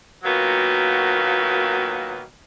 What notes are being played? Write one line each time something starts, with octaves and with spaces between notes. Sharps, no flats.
A#2 D#3 F#3 A#3 B3 F#4